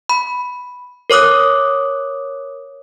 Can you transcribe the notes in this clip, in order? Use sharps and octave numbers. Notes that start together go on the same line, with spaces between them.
B5
A#4 C#5 D6 D#6 F#6